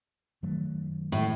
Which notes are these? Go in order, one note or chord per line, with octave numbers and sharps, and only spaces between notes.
F#2 D#3 F#3 A3
A2